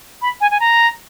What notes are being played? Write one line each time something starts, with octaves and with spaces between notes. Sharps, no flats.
B5
G#5
G#5
A#5